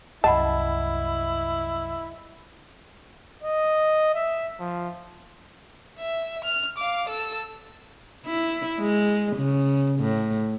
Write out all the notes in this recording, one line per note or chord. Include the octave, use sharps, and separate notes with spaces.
C2 F#2 E4 D#5 F#5 A5 B5
D#5
E5
F3
E5
F6
F5 D6
A4 E6
E4
G#3
C#3
A2